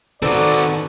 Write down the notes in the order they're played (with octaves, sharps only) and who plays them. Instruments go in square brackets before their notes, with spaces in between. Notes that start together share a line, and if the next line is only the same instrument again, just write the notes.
[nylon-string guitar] D#3 B4 [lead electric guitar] C4 F#4 [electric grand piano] A4 [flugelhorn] D5